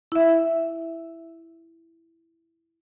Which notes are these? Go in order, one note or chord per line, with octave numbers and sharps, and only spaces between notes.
E4 E5